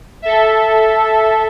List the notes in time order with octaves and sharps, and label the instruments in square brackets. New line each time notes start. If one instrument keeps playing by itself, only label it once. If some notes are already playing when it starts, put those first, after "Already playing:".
[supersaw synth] A4 E5